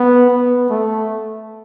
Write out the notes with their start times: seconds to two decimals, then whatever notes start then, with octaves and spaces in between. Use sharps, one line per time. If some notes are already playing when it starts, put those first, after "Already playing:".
Already playing: B3
0.30 B3
0.70 A3